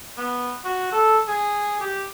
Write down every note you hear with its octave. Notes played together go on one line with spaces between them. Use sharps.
B3
F#4
A4
G#4
G4